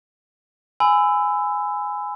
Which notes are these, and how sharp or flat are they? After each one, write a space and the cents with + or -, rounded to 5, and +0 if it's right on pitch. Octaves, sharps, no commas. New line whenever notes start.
G#5 +0 B5 +35 E6 +0